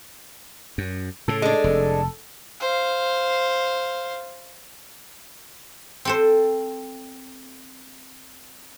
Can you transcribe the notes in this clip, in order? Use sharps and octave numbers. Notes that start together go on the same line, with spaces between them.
F#2
A2 C#3 A4
G#3 D4
F1
C5 F5
C4 A4 C5